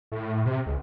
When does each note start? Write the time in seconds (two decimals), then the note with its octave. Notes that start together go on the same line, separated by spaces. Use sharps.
0.12 A2
0.46 C3
0.66 C#2